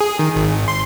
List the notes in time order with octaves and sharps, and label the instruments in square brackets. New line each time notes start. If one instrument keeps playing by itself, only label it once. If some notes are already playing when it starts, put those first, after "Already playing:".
[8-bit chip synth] G#4
D#3
G#1
C6